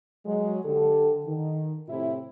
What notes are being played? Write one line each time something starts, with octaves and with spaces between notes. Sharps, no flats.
F#3 G#3
D3 G4 A4
D#3
A2 C3 E4